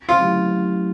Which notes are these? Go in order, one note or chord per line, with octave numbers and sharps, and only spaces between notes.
F4
F#3 A3 C#4 E4 G4